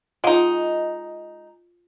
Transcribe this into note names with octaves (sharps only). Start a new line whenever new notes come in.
G#3 D#4 F4 F5 F#5